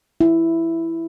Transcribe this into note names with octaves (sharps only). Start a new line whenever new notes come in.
E4